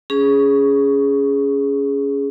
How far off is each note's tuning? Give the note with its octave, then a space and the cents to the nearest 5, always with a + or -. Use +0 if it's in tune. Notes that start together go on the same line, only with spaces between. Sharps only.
C#4 +15 G#4 +0